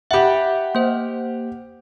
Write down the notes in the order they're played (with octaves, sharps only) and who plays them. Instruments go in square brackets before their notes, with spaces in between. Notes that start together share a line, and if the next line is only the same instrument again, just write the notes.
[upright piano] G4 F#5 [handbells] E5 B5
[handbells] A#3 C5